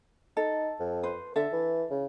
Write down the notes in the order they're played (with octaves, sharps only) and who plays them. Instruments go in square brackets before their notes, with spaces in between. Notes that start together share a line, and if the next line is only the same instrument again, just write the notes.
[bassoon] D#4 [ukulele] A4
[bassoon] F2
[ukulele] B4 C5
[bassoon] D3 [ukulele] A4 E5
[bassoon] E3
C#3